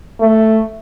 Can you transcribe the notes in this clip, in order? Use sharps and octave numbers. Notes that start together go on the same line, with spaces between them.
A3